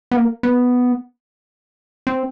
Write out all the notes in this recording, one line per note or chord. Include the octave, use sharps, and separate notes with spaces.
B3
A#3
B3
C4